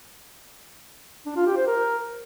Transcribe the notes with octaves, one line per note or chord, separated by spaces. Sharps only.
D4
F4
G4
C5
A#4